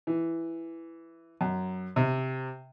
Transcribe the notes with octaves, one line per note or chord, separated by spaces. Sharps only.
E3
F#2
C3